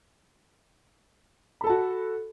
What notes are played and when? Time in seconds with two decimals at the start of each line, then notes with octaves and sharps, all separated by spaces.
1.61 B5
1.64 A4
1.67 A5
1.70 F#4